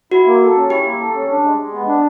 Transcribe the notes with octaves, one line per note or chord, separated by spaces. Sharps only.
E4 F#4
A#3
A4
C#4
E4 G4
A#3
A4
C#4
D4
G#3
G#3
B3
D4